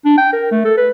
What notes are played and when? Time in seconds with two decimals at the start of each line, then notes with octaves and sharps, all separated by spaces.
0.05 D4
0.18 G5
0.33 A#4
0.51 A3
0.65 A4
0.77 B4